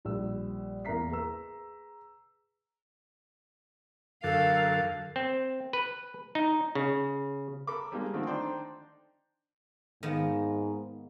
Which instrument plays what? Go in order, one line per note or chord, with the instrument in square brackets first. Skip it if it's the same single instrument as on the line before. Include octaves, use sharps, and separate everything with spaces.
[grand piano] A#1 G3 E6
E2 A#3 E5 A#5 B6 C7
G#4 B4 A#5 E6
[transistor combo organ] F#2 D3 A5 [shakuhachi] A4 [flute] A#4 [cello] F5
[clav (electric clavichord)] C4
B4
D#4
C#3
[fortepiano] A4 A#4 B5 D6
G3 G#3 A#3
D3 D#3 F3 A3 C4
D4 D#4 C5 D5 G5 C6
[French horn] G#2 [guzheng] D#3 A#3 B3